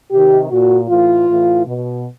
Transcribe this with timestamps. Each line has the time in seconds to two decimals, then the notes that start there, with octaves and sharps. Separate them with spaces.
0.12 C3 D#3 G4
0.51 A#2 F#4
0.90 A2 E3 F4
1.28 A2 E3
1.67 B2